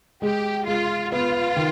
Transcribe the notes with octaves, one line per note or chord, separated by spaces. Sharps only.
G#3 G4
G#3 F4
B3 F4
D#3